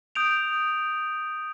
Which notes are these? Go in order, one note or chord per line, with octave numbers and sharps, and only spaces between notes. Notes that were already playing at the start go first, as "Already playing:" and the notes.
D#6 G6 D7 F7